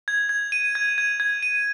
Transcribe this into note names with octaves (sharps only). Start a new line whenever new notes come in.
G#6
G#6
D#7
G#6
G#6
G#6
D#7